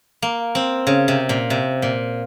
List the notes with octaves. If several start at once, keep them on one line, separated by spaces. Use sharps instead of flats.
A#3
C4
C#3
C3
A#2
C3
A#2